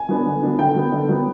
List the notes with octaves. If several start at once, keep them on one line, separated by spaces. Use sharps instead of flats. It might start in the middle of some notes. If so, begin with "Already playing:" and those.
Already playing: G#5
F#3 B3 D4
D3
F#3 B3 D4
D3 G5
F#3 B3
D3
F#3 B3